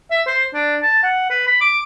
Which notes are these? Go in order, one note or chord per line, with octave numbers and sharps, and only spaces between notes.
E5
C5
D4
A5
F#5
B4
B5
D6